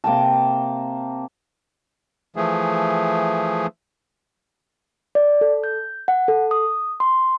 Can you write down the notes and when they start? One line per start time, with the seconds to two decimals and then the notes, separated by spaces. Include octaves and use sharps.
0.04 C3 A#3 G5 A5
2.36 E3 F3 A3 G#4
5.15 D5
5.41 A4
5.64 G6
6.08 F#5
6.28 A4
6.51 D#6
7.00 C6